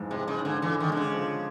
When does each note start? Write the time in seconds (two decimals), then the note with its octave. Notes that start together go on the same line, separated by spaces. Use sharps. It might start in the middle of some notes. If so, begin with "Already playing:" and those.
Already playing: F2 G#2 E3
0.10 C3 G#3
0.28 C#3
0.37 G#2
0.45 D3
0.62 D3 E3
0.80 D#3
0.89 D3 G#3
0.97 C#3
1.14 F3